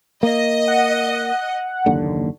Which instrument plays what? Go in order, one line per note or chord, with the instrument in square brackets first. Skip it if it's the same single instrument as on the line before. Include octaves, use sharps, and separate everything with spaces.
[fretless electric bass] A#3 [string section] D#5
[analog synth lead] F#5
[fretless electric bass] F#1 D#2 D3